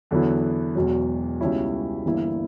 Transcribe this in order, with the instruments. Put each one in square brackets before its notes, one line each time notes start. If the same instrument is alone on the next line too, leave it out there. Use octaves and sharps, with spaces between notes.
[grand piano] E2 D3 F#3 B3 E4
E1 E2 B2 F#3
C#2 B2 G3 C#4 E4
G1 G2 E3 A#3 E4